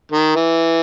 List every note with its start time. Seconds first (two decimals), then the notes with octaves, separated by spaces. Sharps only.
0.12 D#3
0.36 E3